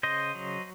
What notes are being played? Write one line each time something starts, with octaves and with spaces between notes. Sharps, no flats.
C#3 C5 D#5
F#3